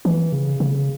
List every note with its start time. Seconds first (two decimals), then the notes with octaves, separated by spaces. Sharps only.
0.05 E3
0.32 C#3
0.60 C#3